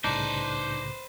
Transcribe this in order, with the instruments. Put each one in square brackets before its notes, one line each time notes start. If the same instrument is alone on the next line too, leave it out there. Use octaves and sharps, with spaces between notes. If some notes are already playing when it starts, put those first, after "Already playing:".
[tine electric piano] C2 A2 C#3 [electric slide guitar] D4 D#4 [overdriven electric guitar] B4 C5